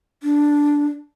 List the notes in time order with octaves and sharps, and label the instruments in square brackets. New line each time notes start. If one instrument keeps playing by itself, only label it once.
[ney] D4